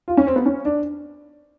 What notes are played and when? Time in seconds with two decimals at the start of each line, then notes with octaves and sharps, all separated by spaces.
0.08 F4
0.17 C#4
0.27 C4
0.36 B3
0.46 C#4
0.65 D4